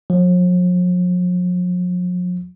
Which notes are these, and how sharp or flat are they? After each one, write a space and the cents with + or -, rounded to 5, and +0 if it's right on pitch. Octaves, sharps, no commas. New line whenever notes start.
F3 +45